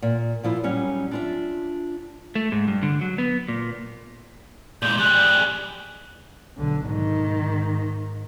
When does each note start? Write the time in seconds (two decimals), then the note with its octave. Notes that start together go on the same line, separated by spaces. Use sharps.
0.02 A#2
0.43 A#2 F3 E4
0.64 F#3 G3 C#4 D#4
1.11 D4 F4 E5
2.35 A3
2.52 G#2
2.68 G2
2.83 D3
3.01 F#3
3.18 B3
3.48 A#2
4.83 A#2 G#3 G6
5.00 G3 G#4 F#6
6.57 B1 D3
6.87 G#2 D#3